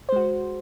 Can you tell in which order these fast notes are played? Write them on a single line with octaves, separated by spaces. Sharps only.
C5 G#3 F#4